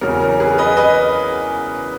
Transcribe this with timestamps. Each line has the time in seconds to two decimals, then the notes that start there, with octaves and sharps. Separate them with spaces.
0.01 E2 C#3 F#3 C#4 A#4
0.20 A#4
0.40 G#4 B4
0.58 B4 D#5
0.77 B4 D#5